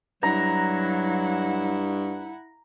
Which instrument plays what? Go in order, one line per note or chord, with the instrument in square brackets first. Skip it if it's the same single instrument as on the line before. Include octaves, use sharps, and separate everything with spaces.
[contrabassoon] G2 [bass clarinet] F#3 [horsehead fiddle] E4 F#5 [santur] A#5